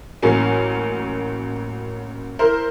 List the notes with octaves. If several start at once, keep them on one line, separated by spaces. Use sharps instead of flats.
A1 F#3 A#3 C#4 G#5
E4 A#4 C5